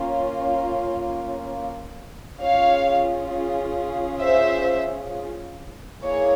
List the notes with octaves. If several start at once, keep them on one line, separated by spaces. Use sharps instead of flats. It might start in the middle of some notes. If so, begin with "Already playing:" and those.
Already playing: A#3 C#4 F4
C#4 F4 G#4 C#5 F5
C5 E5
A#3 E4 G#4 C#5